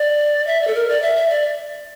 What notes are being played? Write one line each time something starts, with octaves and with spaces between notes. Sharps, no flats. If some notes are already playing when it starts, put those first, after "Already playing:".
Already playing: D5
E5
D5
A4
A#4
D5
E5
E5
D5